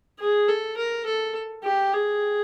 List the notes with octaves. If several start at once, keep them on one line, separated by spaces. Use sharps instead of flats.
G#4
A4
A#4
A4
G4
G#4